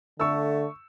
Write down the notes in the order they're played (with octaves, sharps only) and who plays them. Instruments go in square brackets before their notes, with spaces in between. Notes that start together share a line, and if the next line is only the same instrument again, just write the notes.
[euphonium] D3 [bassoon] A3 [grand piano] C#6 E6